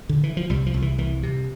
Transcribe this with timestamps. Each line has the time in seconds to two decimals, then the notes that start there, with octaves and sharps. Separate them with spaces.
0.09 D3
0.23 E3
0.37 F3
0.50 C2 G3
0.66 F3
0.74 C2
0.82 E3
0.98 C2 E3
1.23 C3